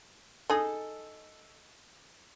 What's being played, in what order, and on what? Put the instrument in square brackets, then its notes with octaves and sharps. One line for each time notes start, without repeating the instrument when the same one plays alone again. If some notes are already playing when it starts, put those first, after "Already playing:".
[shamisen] D#4 G#4 [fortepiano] A4